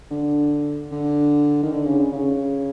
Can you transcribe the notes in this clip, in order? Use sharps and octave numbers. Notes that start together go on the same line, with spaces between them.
D3
D3
D#3
D3
C#3
C#3
C#3